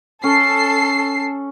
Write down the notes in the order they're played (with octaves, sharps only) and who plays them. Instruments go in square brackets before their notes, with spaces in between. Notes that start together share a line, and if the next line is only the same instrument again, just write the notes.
[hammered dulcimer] C#4 [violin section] A4 C7